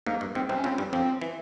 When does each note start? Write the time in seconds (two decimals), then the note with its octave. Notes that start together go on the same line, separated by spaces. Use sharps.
0.07 G#2 A#3
0.21 G2
0.35 G#2 C4
0.49 C2 C3 C4
0.57 C#4
0.64 C#2 C#3 C4
0.78 G2 G3
0.93 F2 F3 C4
1.22 E3